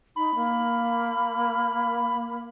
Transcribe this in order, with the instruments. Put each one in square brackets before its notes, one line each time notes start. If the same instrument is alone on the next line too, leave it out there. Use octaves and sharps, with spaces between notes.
[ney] D#4 [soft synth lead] B5
[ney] A#3